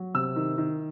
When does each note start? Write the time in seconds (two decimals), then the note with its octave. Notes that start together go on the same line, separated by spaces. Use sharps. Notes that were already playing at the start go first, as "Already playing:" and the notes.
Already playing: F#3
0.14 C3 E6
0.36 D#3
0.58 D#3